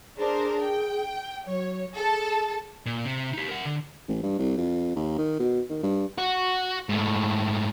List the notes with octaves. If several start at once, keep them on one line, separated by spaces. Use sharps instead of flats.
D4 G#4 A#4 C5
G5
F#3 C#5
G#4 A4 A5
A#2
C3
D#4 G4
A#4 F#5
D3
A1
G2
C2
F2
D#2
D#3
B2
D#3
G2
F#4
G#2 A3